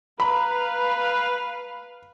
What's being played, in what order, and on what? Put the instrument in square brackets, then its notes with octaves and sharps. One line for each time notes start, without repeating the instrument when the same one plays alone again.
[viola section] B4 F5 [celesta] A#5 [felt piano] B5